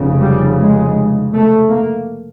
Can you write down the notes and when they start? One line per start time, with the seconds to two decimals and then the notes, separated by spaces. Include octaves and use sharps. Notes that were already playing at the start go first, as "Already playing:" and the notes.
Already playing: F1 F2 C#3
0.21 G3
0.58 G#3
1.33 A3
1.69 A#3